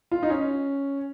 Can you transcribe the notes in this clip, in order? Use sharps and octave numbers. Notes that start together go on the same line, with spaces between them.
F4
D#4
C#4